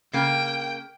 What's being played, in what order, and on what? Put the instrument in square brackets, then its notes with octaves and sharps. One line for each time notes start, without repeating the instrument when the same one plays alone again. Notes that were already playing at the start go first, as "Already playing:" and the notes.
[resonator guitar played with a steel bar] C#3 A#3 [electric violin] G5